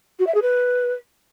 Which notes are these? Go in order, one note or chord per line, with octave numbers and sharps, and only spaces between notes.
F#4
E5
G#4
B4